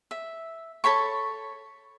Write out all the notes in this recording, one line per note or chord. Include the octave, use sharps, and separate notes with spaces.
E5
A4 C#5 B5 C#6